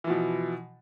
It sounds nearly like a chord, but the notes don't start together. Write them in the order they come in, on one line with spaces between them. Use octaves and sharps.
E3 F3 B2